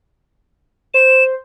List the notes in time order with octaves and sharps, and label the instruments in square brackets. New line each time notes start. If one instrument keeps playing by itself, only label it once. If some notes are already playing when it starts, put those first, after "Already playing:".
[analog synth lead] C5 [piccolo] E7